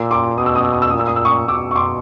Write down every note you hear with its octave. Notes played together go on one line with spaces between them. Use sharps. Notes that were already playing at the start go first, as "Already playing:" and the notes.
Already playing: A#2 D6 E6
C6 D6
B2 D#6
E6
D#6
E6
D#6
E6
A#2 D#6
E6
D#6
E6
C#6 D#6
B2 D6 E6
C#6
C6 D6